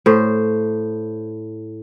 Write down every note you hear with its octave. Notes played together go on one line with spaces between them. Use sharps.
A2 C5